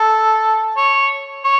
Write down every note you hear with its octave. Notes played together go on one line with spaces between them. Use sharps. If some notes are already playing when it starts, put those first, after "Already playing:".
Already playing: A4
C#5
C#5